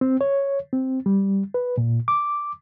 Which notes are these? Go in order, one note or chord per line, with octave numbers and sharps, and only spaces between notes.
C4
C#5
C4
G3
B4
A#2
D6